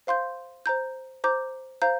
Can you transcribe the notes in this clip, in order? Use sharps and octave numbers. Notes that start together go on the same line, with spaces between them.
C5 F5 C6 G6
C5 A#5 G6
C5 A#5 D6 G6
C5 F5 A#5 G6